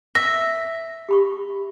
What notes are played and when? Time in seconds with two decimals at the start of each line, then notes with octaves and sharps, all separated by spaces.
0.15 E5 A#6
1.09 G4 B5 C#6